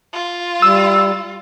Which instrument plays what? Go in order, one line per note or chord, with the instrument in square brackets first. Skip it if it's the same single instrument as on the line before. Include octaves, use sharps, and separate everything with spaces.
[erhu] F4
[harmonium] G3 [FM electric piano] E6